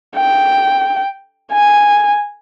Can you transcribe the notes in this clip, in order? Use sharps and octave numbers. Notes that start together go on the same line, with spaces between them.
G5
G#5